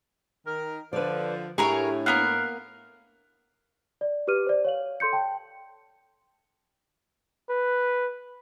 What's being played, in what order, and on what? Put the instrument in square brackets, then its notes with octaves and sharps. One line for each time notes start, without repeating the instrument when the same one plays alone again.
[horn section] D#3 A#4
[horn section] D3 F3 [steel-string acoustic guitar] B4 D5
[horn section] A2 [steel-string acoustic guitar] D4 E4 G#5 [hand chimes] G4 [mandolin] G#4 A#4 C#5
[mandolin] A#3 B3 A#4 [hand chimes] F6 F#6 C7
[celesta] D5
G4 B4 D6 F6 D#7
C5 D5
C#5 F5 F#7
A4 C6 G6 C#7
G5 A5
[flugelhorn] B4